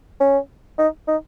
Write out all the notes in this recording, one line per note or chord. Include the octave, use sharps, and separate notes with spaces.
C#4
D#4
D#4